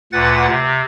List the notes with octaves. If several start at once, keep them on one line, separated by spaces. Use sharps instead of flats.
D2 A#2 B4 F#5 A6
C3